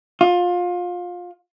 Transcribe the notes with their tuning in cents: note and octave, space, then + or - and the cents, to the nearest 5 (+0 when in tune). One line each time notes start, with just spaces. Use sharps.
F4 +25